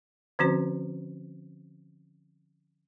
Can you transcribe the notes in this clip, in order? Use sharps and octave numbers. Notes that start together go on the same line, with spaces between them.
D3 F3 C4 C#4 F#4 C5